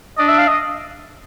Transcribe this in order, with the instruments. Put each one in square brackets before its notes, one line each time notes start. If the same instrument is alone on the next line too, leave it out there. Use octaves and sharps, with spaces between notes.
[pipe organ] D4 D5 [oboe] D#5
[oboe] E5
F5
D#5